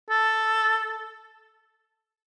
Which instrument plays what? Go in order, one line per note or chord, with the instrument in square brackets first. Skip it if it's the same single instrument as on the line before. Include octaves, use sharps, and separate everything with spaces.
[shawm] A4